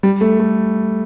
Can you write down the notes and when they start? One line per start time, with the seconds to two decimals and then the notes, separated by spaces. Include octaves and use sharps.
0.03 G3
0.21 A3
0.39 A3